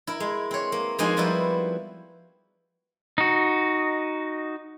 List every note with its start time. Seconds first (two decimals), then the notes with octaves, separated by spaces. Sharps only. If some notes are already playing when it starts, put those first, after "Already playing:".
0.07 E4 A#4
0.20 G#3
0.51 C4 C#5
0.72 A#3
0.98 F3 G#3 A#3 C4 D#4 G#5
1.17 F3 G3 B3 C4 E4 F#4
3.18 D#4 F#4